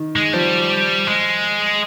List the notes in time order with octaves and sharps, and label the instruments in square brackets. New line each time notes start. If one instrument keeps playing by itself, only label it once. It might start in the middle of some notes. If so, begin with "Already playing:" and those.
Already playing: [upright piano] D#3
[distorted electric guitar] G#3
[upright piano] F3 [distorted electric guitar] G3
[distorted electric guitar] G#3